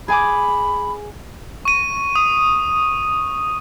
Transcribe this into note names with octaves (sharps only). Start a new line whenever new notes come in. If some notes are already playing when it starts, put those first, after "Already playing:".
G#4 G#5 B5 D6
C#6 D#7
D#6